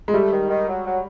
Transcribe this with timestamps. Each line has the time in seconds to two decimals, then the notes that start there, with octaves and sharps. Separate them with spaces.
0.08 G#3
0.13 G3 A3
0.31 D#3
0.50 D#3
0.68 F#3
0.86 F#3